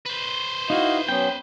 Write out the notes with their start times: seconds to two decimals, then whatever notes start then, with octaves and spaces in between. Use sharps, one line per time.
0.06 B4 C5
0.70 D#4 E4 F#4 D#5 F5
1.08 F#3 B3 C#4 G5